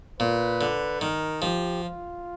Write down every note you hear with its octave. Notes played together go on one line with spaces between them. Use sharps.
A#2 B4
D3
D#3 A#4
F3 G4
F4